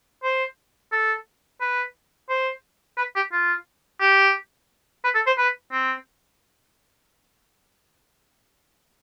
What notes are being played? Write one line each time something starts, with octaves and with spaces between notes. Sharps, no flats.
C5
A4
B4
C5
B4
G4
F4
G4
B4
A4
C5
B4
C4